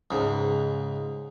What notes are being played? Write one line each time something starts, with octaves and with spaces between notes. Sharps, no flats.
C#2 G#2